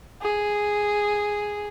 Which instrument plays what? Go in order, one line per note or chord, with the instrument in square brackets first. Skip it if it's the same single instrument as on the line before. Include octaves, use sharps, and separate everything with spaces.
[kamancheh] G#4